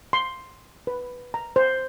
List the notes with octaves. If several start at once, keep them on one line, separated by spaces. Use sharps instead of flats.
C6
B4
A#5
C5